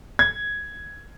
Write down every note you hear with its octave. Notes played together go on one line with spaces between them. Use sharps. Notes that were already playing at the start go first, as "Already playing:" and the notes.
G#6